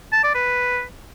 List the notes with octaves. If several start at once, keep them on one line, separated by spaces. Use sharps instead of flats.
A5
D5
B4